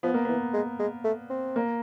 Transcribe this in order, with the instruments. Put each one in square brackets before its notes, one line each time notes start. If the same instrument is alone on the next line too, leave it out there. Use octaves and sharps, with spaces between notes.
[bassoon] F3 [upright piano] B3
[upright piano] A#3
[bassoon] E3 [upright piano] B3
[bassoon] G#3
G#3
A3
C4
[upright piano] A#3